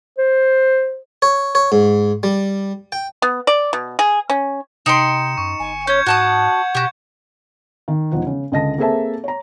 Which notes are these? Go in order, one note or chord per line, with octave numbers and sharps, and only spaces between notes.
C5
C#5
C#5
G#2
G3
G5
B3
D5
B2
G#4
C#4
C3 D#4 G5 C6 C#7 E7
F#2 C#6
G1 G#5
C#4 C#5 G6 G#6
G#2 F#4 F#5 A5 D#6
B2 F#4 G4
D#3
E1 F3 D#4 F#5
C#3
C#2 D3 D#5 A5 A#6
A#3 C4 G#4 A4 E5 A5
C#5 A#5